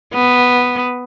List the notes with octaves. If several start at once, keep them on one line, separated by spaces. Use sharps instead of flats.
B3